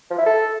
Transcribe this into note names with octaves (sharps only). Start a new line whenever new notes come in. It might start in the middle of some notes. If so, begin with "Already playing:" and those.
F3
E4
A4